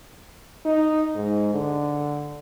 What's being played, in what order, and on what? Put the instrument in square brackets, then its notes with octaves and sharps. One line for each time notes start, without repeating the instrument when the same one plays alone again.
[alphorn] D#4
G#2
D3